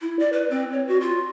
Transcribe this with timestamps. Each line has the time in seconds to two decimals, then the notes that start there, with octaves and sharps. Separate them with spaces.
0.01 E4
0.19 D5
0.33 B4
0.51 C4
0.72 C#5
0.88 F#4
1.01 F4